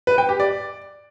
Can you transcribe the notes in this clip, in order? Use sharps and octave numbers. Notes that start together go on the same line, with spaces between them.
B4
G5
G4
D5